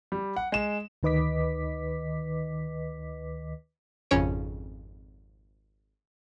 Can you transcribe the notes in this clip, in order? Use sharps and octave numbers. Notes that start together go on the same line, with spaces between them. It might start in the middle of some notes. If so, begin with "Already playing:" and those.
G3
F#5
G#3 E7
D2 D#3 B4 D#5 D6 B6
G#1 F2 C#3 C#4 C#5 D7